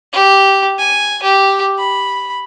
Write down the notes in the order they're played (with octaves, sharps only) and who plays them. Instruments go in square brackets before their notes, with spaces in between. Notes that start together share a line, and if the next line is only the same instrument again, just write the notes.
[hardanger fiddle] G4
G#5
G4
B5